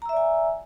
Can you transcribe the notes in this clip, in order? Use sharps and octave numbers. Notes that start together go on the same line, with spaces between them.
D5 E5 G#5 A#5 E6